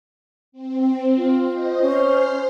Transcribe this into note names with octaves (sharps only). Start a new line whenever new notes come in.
C4
F4
C5 D#5
C#4 C5 C6 F6